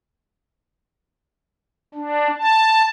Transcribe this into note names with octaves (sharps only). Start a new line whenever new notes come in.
D4
A5